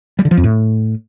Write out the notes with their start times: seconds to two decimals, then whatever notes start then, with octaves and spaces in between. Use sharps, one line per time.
0.19 G3
0.25 D3
0.31 F3
0.37 F2
0.44 A2